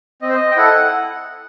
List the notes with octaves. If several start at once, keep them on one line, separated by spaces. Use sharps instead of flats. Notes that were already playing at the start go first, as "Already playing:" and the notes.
C4 D#5
C5
D#5
G5
E4 A4 F#5